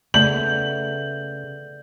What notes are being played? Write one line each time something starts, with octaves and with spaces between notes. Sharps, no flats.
C#3 A3 B3 D5 G6 F#7